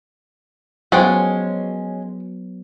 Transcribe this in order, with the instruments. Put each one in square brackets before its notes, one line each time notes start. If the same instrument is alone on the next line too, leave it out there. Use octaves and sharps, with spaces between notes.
[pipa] F3 F#5 G5 [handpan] F#3 B3 [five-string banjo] G#3 C#4